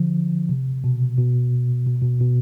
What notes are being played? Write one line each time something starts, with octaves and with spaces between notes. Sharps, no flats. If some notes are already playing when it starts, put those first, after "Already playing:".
Already playing: D3 F3
C3
B2
B2
B2
B2
B2